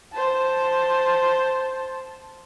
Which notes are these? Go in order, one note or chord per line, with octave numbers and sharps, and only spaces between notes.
C5 A5